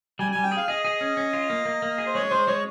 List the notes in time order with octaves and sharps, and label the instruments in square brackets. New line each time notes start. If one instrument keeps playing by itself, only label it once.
[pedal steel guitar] G3 [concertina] G#5
[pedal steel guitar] G3 [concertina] G#5
[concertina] G5
[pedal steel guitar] G#4
[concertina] F5
[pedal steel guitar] G#4 [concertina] D#5
[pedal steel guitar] G#4
C#4
C#4
F4
A#3
A#3
A#3
G#4
[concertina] C5
[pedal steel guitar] G#3 [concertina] C#5
[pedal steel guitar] G#3 [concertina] C5
[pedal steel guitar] G#3 [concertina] C#5